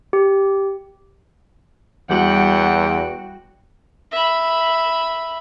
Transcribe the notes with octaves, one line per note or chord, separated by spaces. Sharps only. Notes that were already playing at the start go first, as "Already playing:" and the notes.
G4
E2 G3 F#4 F#5 G5
E5 B5